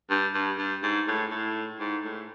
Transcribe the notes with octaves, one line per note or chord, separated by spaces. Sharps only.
G2
G2
G2
G#2
A2
A2
G#2
A2